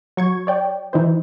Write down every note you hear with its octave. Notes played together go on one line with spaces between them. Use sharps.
F#3 C#6 G#6
C#5 D5 G5
E3 D#4 C5